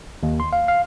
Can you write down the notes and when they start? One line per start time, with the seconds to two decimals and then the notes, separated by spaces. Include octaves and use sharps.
0.23 D#2
0.40 C6
0.53 F5
0.68 F5